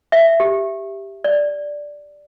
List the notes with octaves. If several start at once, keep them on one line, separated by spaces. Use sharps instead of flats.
E5
G4
D5